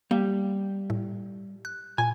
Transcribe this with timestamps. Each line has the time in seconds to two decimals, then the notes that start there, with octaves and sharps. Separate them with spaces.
0.11 G3 A#3
0.90 A2
1.65 F#6
1.98 A#2 G#5